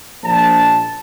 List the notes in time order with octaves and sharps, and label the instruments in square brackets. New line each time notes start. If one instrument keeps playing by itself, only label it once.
[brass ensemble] A#1 A5